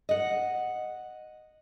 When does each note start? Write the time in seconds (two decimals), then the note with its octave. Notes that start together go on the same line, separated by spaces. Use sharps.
0.09 D#5 F#5